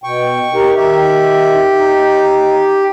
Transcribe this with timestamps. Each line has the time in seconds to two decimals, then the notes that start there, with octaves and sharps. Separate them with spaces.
0.04 B2 G5 C#6
0.54 D#4 G4 A#4
0.76 D#3 G4 E5
1.78 D#4